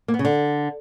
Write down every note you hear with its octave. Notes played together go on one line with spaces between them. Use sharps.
A#3
B3
C#3
D3